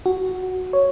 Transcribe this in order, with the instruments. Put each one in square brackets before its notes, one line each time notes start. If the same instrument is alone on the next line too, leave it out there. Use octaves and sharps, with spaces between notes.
[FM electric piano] F#4
C#5